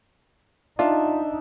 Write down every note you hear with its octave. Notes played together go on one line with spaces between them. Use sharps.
D4 D#4 F4 E5